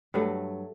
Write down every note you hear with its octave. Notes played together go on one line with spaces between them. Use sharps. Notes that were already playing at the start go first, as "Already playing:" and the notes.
G2 F#3 A3